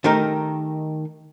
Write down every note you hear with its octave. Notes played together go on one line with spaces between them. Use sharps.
D#3 A3 D#4 G4 A#4